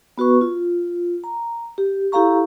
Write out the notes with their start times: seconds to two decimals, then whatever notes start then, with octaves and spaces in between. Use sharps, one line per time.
0.18 B3 F#4 B4 C#6
0.41 F4
1.24 A#5
1.78 G4
2.12 E4 G4 A4 F5 A#5 C#6